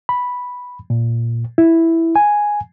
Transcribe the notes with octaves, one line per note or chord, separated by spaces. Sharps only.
B5
A#2
E4
G#5